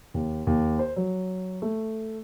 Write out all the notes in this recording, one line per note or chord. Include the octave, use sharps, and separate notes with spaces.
D#2
D#2
C5
F#3
A3